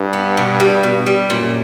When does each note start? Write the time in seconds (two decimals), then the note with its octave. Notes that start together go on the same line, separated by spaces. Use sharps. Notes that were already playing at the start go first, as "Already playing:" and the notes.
Already playing: G2
0.13 B3
0.37 B2
0.60 G3
0.83 B2
1.06 G3
1.30 F#2 A#2